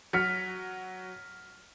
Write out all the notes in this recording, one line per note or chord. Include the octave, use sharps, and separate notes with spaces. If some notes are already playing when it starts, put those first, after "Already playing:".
F#3 F6 B6 C#7